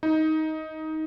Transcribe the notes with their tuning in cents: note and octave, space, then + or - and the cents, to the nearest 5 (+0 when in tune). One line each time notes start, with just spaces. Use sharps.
D#4 +15